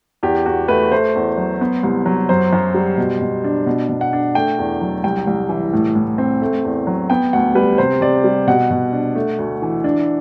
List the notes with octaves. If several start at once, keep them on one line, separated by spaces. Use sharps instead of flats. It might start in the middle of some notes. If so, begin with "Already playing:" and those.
E2 G4
E2 F#4
A3 B4
A3 C5
E2
F#3
B3
C2
F#3
F#2 C5
F#2
G3
B2
B2
D4
B2
B2
F#5
D4
A3 G5
E2
F#3
C2 G5
C2
E3
A2
A2
C4
A3
E2
F#3
B3 G5
D2 F#5
G3 B4
C3 C5
C3 D5
G3
B2 F#5
B2
D4
A3
D2
E3
D4